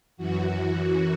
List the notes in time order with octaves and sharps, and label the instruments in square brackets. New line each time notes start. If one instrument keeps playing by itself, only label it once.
[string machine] F#2 E3 F#4